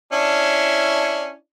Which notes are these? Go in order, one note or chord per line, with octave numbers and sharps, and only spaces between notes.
C#4 D4 E4